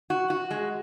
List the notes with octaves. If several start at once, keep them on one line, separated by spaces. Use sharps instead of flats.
F#4
F#4
G#3